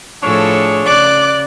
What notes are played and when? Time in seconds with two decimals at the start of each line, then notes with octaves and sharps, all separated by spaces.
0.23 A2 F3 D4 G#4 A4 C#5
0.86 C#3 D5 D6 F#6